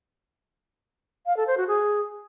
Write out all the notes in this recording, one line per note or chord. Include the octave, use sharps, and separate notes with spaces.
F5
A4
C5
F#4
G#4